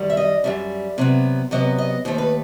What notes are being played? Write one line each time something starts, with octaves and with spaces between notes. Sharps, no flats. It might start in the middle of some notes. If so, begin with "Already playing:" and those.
Already playing: F#2 D#3 G3
E5
D#5
F#2 D#3 G3 E5
C3 F#3 B3
C3 F#3 B3 D#5
D#5
D#2 D#3 A3 C5
B4